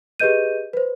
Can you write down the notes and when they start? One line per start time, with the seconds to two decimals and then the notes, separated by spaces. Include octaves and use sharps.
0.20 G4 G#4 B4 D#5 G6 D#7
0.73 B4 C5